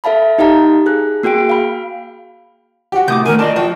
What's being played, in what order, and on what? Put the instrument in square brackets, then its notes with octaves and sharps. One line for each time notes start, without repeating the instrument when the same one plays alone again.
[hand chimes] A4 E5 F5 A5 B5
D#4 G4 D#5 F5 A5 A#5
G#4 F#6
A#3 F#4 G#4 G5 D7
F5 B5
[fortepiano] F#4 G4
[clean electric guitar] A2 C3 [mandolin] D6 D#6 G6
[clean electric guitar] D3 D#3 A3 [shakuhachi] A#4 [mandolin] G#5
[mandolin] D4 [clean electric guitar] F4 D5 A5 [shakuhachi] D#5
[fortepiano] F3 [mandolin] F#4 [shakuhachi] G5